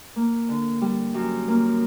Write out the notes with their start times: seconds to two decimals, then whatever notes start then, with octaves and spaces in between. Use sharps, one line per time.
0.16 A#3
0.49 D3
0.81 G3
1.14 F#2
1.48 A#3